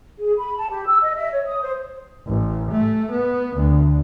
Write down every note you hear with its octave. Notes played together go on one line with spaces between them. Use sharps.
G#4
B5
A5
G4
E6
D#5
E5
C#5
D#6
C5
A1
A3
B3
D2